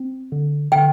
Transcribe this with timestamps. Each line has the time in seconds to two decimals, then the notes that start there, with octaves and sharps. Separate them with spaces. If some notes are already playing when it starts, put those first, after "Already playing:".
Already playing: C4
0.32 D3
0.72 D3 G5